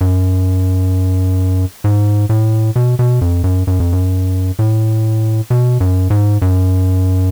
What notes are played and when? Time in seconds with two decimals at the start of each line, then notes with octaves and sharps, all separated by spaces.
0.01 F#2
1.84 G#2
2.29 A2
2.76 B2
2.99 B2
3.21 F2
3.44 F#2
3.67 F#2
3.80 F2
3.92 F#2
4.59 A2
5.50 B2
5.80 F#2
6.10 G#2
6.42 F#2